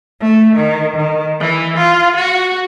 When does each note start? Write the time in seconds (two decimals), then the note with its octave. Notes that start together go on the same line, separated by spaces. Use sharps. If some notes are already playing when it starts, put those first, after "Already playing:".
0.22 A3
0.56 D#3
0.97 D#3
1.39 E3
1.76 F4
2.15 F#4